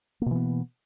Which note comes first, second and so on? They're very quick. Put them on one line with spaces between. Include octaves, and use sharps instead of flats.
A#3 B2 E3 B3